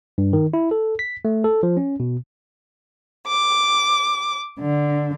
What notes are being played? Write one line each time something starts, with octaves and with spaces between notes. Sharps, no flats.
G2
D#3
E4
A4
B6
A3
A4
F3
C#4
B2
D6
D3